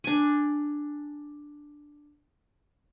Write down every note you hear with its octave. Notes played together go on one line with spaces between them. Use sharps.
D4 G#5